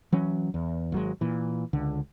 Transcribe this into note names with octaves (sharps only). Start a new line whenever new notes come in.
E3 F#3 C#4
E2
G#1 F#3 G#3
A#2 E3
C#2 D3